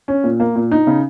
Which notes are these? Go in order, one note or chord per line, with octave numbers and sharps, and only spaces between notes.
C#4
A#2
A#3
A#2
D#4
C#3